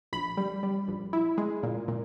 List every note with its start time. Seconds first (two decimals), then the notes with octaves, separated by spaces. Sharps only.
0.13 A#1 B5
0.37 G3
0.63 G3
0.88 A#1
1.13 E4
1.38 G#3
1.63 A#2
1.88 A#2